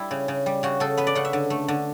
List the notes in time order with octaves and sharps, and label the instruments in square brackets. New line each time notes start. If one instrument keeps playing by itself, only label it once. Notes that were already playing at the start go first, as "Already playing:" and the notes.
Already playing: [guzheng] G3 E4
C#3
C#3
G3
C#3 F#4
C#3 A4
B3 B4
D5
C#3 F#5
E5
D3
A3
D3